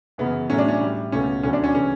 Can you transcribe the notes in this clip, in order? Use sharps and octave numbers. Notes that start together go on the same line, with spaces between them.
F#2 C#3 E3 B3
A2 F#3 A3 C#4
D4
C#4
A2 G3
C#2 B2 A3 C#4
D2 D3 F#3 C#4
D4
C#4
C#3 E3 A3 C#4